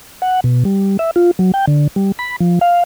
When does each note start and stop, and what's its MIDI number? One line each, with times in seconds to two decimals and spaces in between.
0.22 0.40 78
0.44 0.64 47
0.65 0.97 55
0.99 1.11 76
1.16 1.31 65
1.39 1.52 54
1.54 1.65 79
1.67 1.87 50
1.96 2.12 55
2.19 2.36 83
2.40 2.59 53
2.61 2.83 77